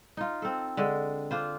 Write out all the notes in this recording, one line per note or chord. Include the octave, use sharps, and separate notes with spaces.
D#4 F4
C4 A4
D3 G#3
D4 F4 C5